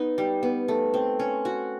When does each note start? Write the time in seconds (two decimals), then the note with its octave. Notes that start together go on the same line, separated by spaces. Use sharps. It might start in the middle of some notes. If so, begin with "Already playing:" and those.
Already playing: B3 D#4
0.18 G3
0.43 B3
0.68 A3
0.94 C4
1.19 C#4
1.45 F#4